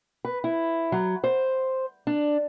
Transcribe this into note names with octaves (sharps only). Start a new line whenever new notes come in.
B4
E4
F#3
C5
D4